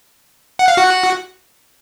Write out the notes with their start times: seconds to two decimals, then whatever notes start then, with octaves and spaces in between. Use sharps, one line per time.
0.59 F#5
0.68 F5
0.77 F#4 F#5